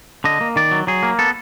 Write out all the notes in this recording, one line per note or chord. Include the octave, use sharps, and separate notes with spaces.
D3 D#5
A#3
D#3 D5
F#3
F#3 G#4
A#3
B3 A4